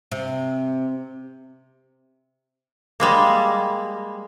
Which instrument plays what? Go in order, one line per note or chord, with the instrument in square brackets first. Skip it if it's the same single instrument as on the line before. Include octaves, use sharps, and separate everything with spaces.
[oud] C3
[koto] G3 G#3 A#3